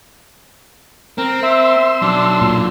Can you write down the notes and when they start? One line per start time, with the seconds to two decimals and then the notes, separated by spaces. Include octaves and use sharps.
1.18 C4 A#4
1.43 E5 C6 E6
2.02 B1 F#3 D4
2.41 A#2